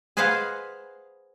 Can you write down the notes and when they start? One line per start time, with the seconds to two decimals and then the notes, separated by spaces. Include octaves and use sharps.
0.17 G#4 B4 C5 D#5 F5 F#5